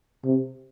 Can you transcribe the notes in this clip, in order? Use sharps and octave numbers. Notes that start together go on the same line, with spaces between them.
C3